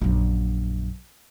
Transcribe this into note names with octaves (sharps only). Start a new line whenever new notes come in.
A#1 F#2